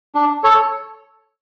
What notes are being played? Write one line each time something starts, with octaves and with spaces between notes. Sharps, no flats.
D4
A4 C#5